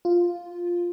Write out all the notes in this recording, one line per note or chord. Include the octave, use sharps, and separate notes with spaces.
F4